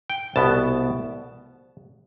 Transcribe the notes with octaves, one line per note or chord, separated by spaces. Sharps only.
G5
C2 B2 B3 A5